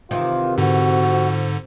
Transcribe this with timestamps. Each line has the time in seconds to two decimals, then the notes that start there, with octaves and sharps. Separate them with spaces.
0.11 C3 D#3 E3 F4
0.58 G#2 D3 F#4
1.03 F3